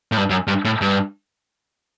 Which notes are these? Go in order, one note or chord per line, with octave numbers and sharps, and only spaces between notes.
A2
G2
F#2
G2
A2
G2